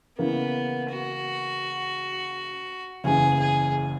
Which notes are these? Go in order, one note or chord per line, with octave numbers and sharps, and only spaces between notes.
C#3 E3 A#3 B3
F#4
F#1 E2 C#3 G#4
G#4